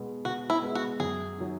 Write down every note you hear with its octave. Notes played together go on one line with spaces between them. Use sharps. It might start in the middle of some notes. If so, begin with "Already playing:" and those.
Already playing: B2 G#3 B3
B2 F#4
E4
G#3 B3
F#4
F#2 G#4
D#3 F#3